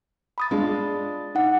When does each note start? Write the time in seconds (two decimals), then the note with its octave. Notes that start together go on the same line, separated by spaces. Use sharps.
0.38 B5 D#6 A6
0.51 G#3 D4 F4
1.35 D#4 F#5